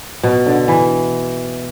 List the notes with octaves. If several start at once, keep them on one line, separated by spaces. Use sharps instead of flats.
B2
D3
E3